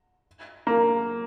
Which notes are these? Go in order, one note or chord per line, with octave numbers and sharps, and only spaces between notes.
A#3